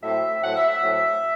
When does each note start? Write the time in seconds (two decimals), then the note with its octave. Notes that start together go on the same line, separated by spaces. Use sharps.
0.03 A2 F#3 A3 C4 E5
0.42 A2 F#3 A3 C4 F#5
0.56 E5
0.68 E5
0.82 A2 F#3 A3 C4